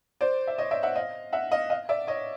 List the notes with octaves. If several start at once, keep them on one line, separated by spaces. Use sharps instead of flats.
C5 D5
E5
C#5 D#5
D5 E5
E5 F#5
D#5 F5
E5 F#5
D#5 F5
D#5 F5
D5 E5
C#5 D#5